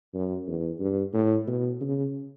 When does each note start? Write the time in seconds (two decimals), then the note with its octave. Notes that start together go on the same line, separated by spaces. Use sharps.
0.14 F#2
0.47 E2
0.80 G2
1.14 A2
1.48 B2
1.81 C#3